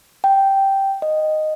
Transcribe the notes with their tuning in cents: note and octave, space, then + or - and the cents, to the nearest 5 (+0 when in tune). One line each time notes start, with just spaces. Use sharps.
G5 -5
D#5 -10